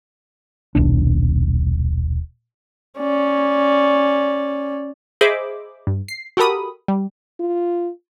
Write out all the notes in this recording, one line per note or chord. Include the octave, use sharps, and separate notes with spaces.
D#1 B1 D4
C#4 D5
G#4 C5 D#5 E5 B5 D6
G2
C7
F#4 G4 A4 A#4 B5 D#6
G3
F4